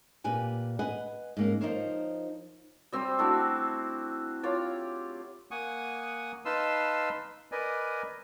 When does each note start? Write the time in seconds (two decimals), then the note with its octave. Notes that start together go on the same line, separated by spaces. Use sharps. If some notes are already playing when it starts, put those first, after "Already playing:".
0.24 A#2 G4 B4 G#5
0.79 B4 D#5 F#5 G#5
1.37 G#2 A#3 C#4
1.61 F3 D#4 F4 A#4 C5 C#5
2.92 G3 C4 G4
3.19 A3 D4 E4 F#4
4.43 F4 G4 C#5 D5
5.51 A#3 F#5 G#5 C#6 D#6
6.45 D#4 B4 F5 A5 C6 E6
7.52 A#4 B4 D5 D#5 G#5